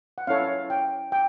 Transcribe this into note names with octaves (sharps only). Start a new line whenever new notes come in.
F#5
C#4 E4 A4 C#5 F5
G5
G5